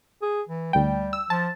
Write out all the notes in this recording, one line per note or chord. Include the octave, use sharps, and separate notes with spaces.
G#4
E3
D2 G3 G5
E6
F3 A5